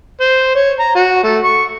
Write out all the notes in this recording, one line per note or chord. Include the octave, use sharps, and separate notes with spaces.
C5
C#5
A#5
F#4
A3
C#6